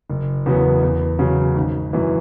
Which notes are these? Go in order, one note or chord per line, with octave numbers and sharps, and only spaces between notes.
F#1
E2 C#3 F#3 B3
E2
C#3 F#3
G#1
F#2 E3